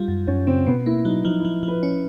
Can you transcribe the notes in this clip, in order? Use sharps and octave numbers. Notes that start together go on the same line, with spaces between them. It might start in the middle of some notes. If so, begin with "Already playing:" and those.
Already playing: G3 F4
F#2
F#2 C#4
C#3 C4
B2 B3
A#3 E4
F#3 D#4
F3 D#4
E4
F3
F3
B4
C#4